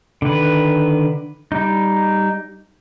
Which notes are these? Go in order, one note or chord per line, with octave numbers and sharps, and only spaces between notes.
D3 D#3 B4
G3 D#4